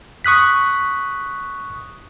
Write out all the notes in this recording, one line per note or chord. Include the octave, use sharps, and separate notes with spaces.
C#6 D#6 F#6 B6